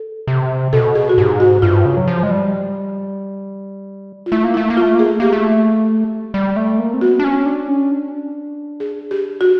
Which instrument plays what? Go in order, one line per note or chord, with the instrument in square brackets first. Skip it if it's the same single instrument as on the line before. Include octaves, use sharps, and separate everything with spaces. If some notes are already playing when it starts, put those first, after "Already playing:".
Already playing: [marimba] A4
[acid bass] C3
[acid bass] B2 [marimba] A4
[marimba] G#4
F#4
[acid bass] G#2 [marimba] G4
[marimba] F#4
[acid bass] G2 [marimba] F4
[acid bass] C#3
F#3
F3
G#3
G3
[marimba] F4
[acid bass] A3 [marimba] E4
[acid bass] A#3
[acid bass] A3 [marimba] E4
[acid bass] A#3
[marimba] F4
[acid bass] A3
[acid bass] A#3 [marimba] G#4
[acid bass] A3
[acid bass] A#3 [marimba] G4
[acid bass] A3
G3
A3
A#3
C4
[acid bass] B3 [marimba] F#4
[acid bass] D4
C#4
D4
C#4
D4
[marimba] G#4
G4
F#4